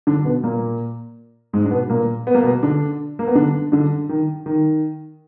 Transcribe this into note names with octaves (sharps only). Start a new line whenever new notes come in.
D3 D4
B2 B3
A#2 A#3
G#2 G#3
D4
B2 B3
A#2 A#3
B3
A#3
B2 B3
D3 D4
A#3
B3
D3 D4
D3 D4
D#3
D#3